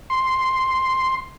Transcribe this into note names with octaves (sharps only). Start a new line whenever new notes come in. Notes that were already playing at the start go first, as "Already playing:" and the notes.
C6